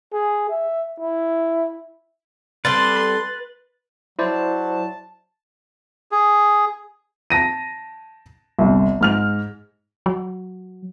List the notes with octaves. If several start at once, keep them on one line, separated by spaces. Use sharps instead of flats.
G#4
E5
E4
G3 C4 A4 B4 C6 A6
F#3 E4 C5 D5 A5
G#4
A5 A#6 D#7
G1 C2
G#2 F6 F7
F#3